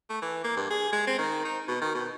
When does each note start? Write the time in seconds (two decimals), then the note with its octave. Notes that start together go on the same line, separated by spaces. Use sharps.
0.10 A3
0.22 E3
0.44 A#3
0.57 G2
0.70 G#4
0.93 G#3
1.07 C4
1.18 D#3
1.45 D#4
1.68 B2
1.82 D#3
1.95 B2